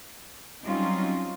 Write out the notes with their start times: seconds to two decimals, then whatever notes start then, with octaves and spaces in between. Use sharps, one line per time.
0.65 F#3 G3 C4 C#4 D#4 F4